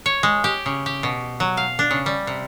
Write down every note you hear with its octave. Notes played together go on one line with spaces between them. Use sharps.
C#5
G#3
G4
C#3
G4
B2
F#3
F5
D4
C#3
G3
C3